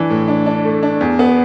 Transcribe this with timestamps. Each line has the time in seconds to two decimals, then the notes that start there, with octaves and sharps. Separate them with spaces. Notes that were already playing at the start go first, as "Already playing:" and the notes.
Already playing: E3 D4
0.10 A2
0.28 D4
0.46 D4
0.65 A3
0.83 D4
1.01 E2
1.19 B3